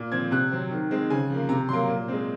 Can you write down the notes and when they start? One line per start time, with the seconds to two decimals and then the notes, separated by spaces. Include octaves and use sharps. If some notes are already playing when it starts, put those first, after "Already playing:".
Already playing: A#2
0.12 F3 C4 G#6
0.31 C3 F#6
0.51 F#3 C4
0.71 D#3
0.91 G#3 C4
1.10 C#3 G#5
1.30 F3 A#3
1.49 C3 A#5
1.69 F#3 A#3 C6
1.88 A#2
2.08 G#3 C4